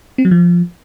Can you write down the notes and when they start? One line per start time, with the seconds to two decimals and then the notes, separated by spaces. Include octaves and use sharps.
0.18 C4
0.25 F#3
0.31 F3